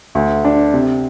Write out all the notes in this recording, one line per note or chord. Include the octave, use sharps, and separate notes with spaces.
D2
D4
C3